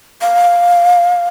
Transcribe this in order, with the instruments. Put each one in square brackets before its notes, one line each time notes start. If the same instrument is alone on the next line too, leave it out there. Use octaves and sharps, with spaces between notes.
[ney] F5